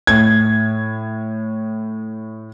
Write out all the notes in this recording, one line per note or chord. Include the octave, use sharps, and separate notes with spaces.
A2 G#6